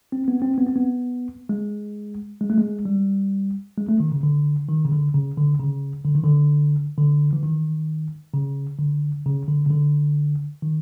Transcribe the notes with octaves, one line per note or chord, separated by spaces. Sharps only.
C4
B3
C4
B3
C4
B3
G#3
G#3
A3
G#3
G3
G#3
A3
D#3
C#3
D3
D#3
C#3
D3
C#3
D3
C#3
D3
D#3
D3
D3
E3
D#3
C#3
D3
C#3
D3
C#3
D3
D#3